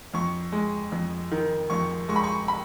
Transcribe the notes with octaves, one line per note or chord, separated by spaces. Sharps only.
F2 C#6
G#3
F2
D#3
F2 C#6
G#3 C#6
B5
C#6
B5